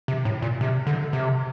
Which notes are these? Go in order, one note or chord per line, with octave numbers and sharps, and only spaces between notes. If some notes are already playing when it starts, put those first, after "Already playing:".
C3
A2
A#2
C3
D3
C3